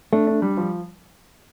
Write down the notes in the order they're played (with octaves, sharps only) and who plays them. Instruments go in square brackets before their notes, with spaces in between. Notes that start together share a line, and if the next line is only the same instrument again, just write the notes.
[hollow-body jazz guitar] A3 [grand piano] D4
[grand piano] D4
G3
F3